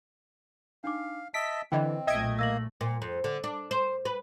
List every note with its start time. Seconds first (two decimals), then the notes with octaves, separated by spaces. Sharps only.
0.84 D4 D#4 F5 D6
1.34 D#5 E5 A5 B6 D7
1.72 D3 E3 C4 D#5 G5
2.07 B1 A#2 A3 D#5 E5 G5 G#6 D7
2.39 A#3 E6 A#6 F#7
2.81 A#2
3.02 F2
3.24 D3
3.44 D4
3.71 C5
4.05 B4